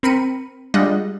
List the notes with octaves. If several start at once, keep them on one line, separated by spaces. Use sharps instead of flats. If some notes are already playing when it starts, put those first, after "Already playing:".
C4 A#4 B5 C#7 D#7
G3 G#3 D4 F4 D#5 F#5